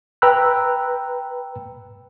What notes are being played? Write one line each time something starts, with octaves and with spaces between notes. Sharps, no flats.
B4 G5 A#5 B5 E6 F#6